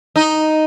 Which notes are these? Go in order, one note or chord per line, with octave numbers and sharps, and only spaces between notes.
D#4